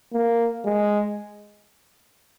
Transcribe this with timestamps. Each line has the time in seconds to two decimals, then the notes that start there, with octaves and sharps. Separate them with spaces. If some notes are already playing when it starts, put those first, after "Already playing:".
0.13 A#3
0.65 G#3